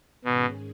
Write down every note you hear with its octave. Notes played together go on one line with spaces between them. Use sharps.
G#2 B2 D#3 G#3 C#4 G#4